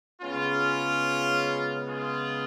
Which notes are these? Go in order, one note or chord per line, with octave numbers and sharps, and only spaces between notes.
C#3 G#3 B3 C#4 F4
F4 G#4